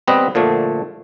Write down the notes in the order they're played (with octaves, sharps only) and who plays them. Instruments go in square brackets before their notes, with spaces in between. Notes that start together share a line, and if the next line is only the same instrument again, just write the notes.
[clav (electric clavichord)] G3 B3 C4 B4 D#5
A#2 D3 F3 A3